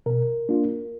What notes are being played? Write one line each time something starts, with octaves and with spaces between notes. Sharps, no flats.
B2 A#4
A#3 D4 F4